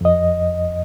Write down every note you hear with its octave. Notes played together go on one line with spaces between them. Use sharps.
F2 D#5